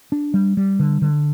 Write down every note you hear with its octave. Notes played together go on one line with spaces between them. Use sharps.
D4
G3
G3
D3
D3